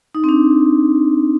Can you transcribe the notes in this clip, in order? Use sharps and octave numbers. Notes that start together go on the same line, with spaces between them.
D#4
C4
D4